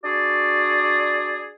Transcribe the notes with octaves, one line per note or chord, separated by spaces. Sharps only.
D4 F#4 G#4 D5